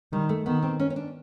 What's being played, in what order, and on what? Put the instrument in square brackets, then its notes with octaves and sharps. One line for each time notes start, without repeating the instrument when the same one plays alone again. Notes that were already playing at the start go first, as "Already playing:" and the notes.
[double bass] D#3 [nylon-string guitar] G3
[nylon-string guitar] A3
[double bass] D#3 [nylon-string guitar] B3
[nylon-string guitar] C4
C#4
C#4
D4